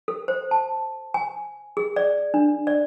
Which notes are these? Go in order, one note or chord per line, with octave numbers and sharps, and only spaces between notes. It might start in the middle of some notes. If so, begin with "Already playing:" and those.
A4
C5
A5
G#5
G#4
D5
D4
D5